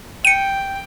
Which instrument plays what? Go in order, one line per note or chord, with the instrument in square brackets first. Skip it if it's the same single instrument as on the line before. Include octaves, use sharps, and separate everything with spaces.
[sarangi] G5 [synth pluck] C#7 D#7